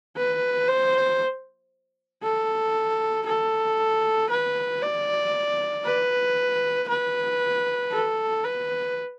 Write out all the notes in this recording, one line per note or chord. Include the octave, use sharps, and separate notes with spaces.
B4
C5
A4
A4
B4
D5
B4
B4
A4
B4